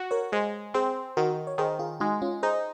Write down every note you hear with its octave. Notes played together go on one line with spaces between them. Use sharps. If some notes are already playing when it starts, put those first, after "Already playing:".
Already playing: F#4
A#4 C#5
G#3 G#4 C5
C4 G#4 C5
D#3 F#4 A#4
C#5
D#3 G#4 C5
F4 G#4
G#3 D#4 F#4
C#4 F4
D#4 G#4 C5